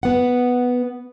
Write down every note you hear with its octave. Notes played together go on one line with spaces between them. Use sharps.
B3 F#5